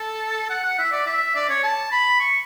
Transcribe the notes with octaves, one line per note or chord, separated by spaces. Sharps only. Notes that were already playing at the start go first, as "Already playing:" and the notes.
Already playing: A4
F#5
F#5
E5
D5
E5
D5
C#5
A5
B5
C#6